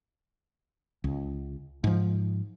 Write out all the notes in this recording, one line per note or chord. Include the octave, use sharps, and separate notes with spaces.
C#2
G#2 F3